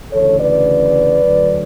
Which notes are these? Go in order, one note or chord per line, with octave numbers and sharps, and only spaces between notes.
D2 C#3 E3 A4 C#5
B4 D5
D2 D3 F#3